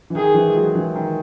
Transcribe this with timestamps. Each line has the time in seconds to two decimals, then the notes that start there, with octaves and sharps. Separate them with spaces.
0.10 E3
0.15 D#3 G#4
0.34 E3
0.48 G#3
0.55 F#3
0.75 E3
0.95 D#3